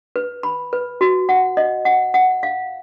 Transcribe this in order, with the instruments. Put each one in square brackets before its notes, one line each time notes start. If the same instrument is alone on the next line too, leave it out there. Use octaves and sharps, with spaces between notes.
[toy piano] B4
B5
B4
F#4
F#5
D#5
F#5
F#5
F5